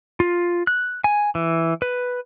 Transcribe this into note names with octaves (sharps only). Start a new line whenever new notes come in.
F4
F#6
G#5
E3
B4